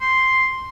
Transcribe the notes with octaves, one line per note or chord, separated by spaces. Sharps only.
C6